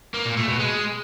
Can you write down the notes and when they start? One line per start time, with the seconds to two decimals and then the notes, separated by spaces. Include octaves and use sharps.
0.14 A#3
0.25 A#2
0.37 A3
0.48 B2
0.59 G#3